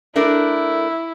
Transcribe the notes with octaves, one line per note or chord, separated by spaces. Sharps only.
A3 D4 E4 A#4